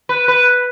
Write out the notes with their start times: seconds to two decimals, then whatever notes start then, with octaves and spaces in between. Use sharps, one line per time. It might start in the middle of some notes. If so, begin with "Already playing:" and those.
0.09 B4
0.28 B4